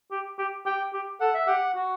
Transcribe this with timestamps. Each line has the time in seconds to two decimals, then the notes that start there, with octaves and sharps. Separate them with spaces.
0.11 G4
0.39 G4
0.66 G4 G5
0.93 G4
1.20 A4 F#5
1.34 E5
1.47 G4 F#5
1.75 F#4